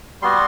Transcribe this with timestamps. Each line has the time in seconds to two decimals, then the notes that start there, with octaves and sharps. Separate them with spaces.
0.22 G3 B3 F#4 C6